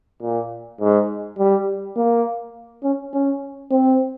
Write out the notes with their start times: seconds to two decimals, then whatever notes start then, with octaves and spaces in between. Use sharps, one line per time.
0.22 A#2
0.80 G#2
1.38 G3
1.96 A#3
2.83 C#4
3.13 C#4
3.71 C4